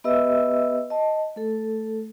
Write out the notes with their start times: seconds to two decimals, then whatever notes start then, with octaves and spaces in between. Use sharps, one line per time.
0.04 B3 G4 B4 D#5 E5 E6
0.90 D#5 A5
1.36 A3 A4